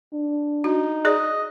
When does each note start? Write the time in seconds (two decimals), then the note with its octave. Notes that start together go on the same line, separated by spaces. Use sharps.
0.13 D4
0.64 D#4 F#4
1.05 G#4 D5 D#5